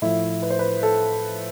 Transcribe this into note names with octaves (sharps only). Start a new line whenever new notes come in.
A2 F3 E4
B4
C5
B4
A4